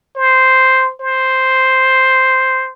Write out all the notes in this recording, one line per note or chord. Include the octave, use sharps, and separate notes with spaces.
C5
C5